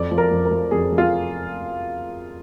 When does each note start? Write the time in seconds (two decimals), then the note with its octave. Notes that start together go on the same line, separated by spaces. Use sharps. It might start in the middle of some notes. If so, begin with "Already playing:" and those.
Already playing: F2 D5
0.11 F3
0.18 A#4
0.31 F2
0.45 A#4
0.51 F3
0.71 F2 G#4
0.92 F3
0.98 F4